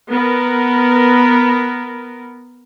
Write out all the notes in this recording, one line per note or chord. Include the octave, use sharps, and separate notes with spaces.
B3 A#4